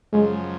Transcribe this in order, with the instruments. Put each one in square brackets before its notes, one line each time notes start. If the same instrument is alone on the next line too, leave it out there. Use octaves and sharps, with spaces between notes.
[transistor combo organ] F#2 C#3 F3 [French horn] G#3